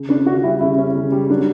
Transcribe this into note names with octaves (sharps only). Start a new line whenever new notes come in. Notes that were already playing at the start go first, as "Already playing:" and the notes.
Already playing: C#3
C#4 D4
C#3 F#4
G3 E4
C#3 E4
C#4
C#3
G3
F#3 D4